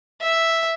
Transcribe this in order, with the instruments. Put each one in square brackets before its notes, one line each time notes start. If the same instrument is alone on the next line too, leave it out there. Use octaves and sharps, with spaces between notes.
[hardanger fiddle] E5